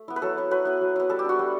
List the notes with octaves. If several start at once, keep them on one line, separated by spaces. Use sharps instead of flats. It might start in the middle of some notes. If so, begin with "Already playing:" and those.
Already playing: A3
B3 E4
B4
F#3 A4
B3 E4
F#3 B4
B3 E4
F#3
B3 E4
G3 A4
G4
D4 F#4
G3